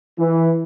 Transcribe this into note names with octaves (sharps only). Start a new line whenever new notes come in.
E3